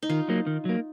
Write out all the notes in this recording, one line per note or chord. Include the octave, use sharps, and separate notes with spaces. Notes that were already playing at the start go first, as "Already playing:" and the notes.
D#4
D#3 F4
F#3 A#3
D#3
F#3 A#3